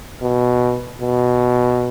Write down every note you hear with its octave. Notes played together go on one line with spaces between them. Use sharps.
B2
B2